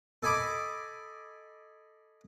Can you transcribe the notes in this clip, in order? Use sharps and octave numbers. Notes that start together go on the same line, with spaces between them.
A4 D#5 G#5 B5 D6